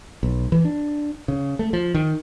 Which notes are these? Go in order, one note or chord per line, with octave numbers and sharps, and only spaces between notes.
B1
E3
D4
C#3
A3
F3
D#3